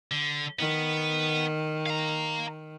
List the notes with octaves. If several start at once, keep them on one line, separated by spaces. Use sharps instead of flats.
D3
D#3 B3
F5 A#5